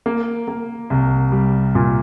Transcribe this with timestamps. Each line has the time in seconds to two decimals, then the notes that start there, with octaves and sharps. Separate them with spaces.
0.06 A#3
0.48 A#3
0.90 C2
1.32 G3
1.75 A#2